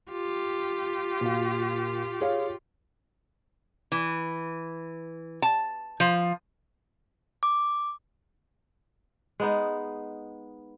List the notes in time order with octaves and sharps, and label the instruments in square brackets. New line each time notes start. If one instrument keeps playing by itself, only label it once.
[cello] F4 G4
[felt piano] A#2 F#4 F5
G#4 C#5 F5
[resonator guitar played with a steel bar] E3
A5
F3
[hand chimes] D6
[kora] G#3 B3 D#4